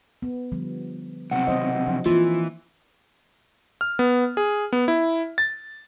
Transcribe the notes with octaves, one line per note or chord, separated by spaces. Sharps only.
B3
D3 F3 G3
B1 C3 F#5
D#3 C5 D#5
F3 D4
E3 A#3 C4 F4
F6
B3
G#4
B3
E4
A6